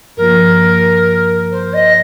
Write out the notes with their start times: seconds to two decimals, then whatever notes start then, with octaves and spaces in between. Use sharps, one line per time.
0.17 G2 F3 A#3 F4 A#4
1.51 C5
1.73 D#5